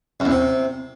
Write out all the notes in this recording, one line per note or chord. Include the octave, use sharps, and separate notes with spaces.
F#2
E2
C3